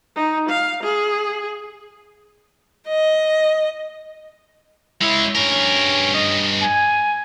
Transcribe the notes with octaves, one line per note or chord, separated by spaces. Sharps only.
D#4
F5
G#4
D#5
G#3 E4 C#5
G2 C#4 A#4
D#5
G#5